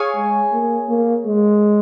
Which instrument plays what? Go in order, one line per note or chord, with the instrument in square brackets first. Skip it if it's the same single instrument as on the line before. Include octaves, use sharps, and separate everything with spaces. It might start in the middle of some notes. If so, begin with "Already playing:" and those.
Already playing: [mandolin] G#4 C#5 F5 G#5
[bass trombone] G#3
A#3
A#3
G#3